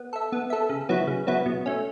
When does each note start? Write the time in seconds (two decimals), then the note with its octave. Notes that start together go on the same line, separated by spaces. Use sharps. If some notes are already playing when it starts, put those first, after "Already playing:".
Already playing: B3
0.13 A4 E5
0.32 B3
0.50 A4 E5
0.69 C#3
0.89 F#3 B3 E4
1.07 C#3
1.27 F#3 B3 E4
1.46 B2
1.66 A3 C#4